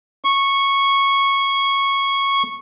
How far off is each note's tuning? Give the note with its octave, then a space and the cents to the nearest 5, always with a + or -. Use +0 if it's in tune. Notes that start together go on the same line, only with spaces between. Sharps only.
C#6 -10